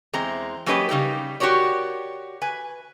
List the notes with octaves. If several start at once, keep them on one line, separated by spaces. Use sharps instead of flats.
E2 G#3 C4 A#5
F#3 A#3 C#4 G4 B4 D#5
C#3 G3 D#4 G4
F#4 G4 A#4 C#5 D5
B4 G#5